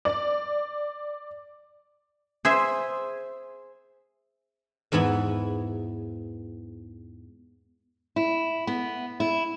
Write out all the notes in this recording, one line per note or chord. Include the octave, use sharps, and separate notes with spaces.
D5
G#4 C5 E5
E2 G#2 E3 B3 E4
E4
B3
E4